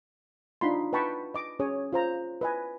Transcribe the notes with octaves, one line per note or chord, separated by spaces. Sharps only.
D4 D#4 F4 B5 C6
B4 D#5 G5 A5 B5 C#6
D#5 D6
C#4 G#4 C#5 D#6
F4 C5 A#5
B4 D#5 G#5